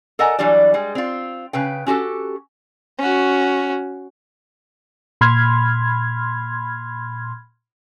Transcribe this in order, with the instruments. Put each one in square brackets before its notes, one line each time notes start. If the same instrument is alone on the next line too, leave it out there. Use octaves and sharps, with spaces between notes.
[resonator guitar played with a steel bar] A4 A#4 D#5 F#5 G#5 A#5
E3 F#3 G3 D4 D5
G3 G#3
C4 F4
C#3 B4 G5
C#4 F#4 G4 A4
[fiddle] C#4 F#4
[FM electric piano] A#2 B5 C6 F6 G#6